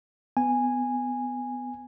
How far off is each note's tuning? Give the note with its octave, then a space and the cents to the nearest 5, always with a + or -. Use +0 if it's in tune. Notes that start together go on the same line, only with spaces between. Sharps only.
B3 +20 G#5 -10